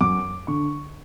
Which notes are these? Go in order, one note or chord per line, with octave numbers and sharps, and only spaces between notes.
F#2 D6
D3 C#6